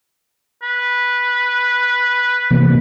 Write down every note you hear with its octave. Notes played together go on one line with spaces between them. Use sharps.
B4
C3 E3 A#3